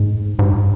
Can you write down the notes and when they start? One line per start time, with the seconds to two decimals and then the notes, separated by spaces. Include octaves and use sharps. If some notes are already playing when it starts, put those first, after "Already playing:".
Already playing: G#2
0.39 G#2
0.46 G2